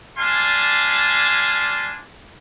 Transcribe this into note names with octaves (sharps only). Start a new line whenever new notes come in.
G3 D4 F5 G#5 A5 C6